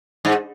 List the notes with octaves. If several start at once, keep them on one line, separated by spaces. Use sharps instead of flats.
G#2